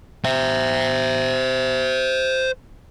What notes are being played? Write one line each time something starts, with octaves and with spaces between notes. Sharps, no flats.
C5 E5